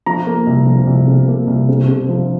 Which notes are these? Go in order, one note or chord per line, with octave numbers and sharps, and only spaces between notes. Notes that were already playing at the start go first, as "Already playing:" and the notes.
F3 A#5
A#3
C2
F3
C2
C3
A#3
C2
C3
C3
F3